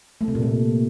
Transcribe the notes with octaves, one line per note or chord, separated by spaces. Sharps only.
A3
C3
A#2
A3